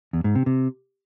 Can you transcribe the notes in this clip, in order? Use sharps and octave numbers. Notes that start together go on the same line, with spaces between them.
E2
G#2
C3
C3